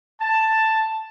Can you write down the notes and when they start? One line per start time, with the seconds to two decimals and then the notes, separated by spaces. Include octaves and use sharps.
0.20 A5